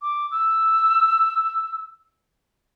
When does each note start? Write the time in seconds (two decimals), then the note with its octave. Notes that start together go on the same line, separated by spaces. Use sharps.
0.02 D6
0.31 E6